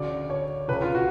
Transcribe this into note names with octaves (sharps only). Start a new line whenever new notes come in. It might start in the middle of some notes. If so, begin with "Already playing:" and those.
Already playing: D2 C#3 D5
C#5
C#2 C#3 B4
F4
F#4